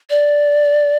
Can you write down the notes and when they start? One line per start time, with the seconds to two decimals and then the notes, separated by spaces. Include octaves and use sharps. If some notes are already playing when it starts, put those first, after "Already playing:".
0.10 D5